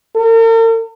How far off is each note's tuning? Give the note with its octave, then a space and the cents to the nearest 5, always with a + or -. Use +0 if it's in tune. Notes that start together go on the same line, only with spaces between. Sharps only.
A#4 -45